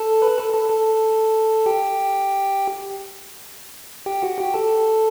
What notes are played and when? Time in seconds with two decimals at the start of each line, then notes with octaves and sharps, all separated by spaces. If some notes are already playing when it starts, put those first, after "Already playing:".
Already playing: A4 A5
0.22 B4 B5
0.38 A4 A5
0.54 A4 A5
0.70 A4 A5
1.66 G4 G5
4.06 G4 G5
4.22 F#4 F#5
4.38 G4 G5
4.54 A4 A5